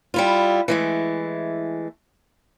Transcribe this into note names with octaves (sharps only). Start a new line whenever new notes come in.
G3 E4 F4
E3 G#3 A3